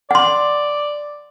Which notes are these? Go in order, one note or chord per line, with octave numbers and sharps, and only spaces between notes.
D5 F#5 C6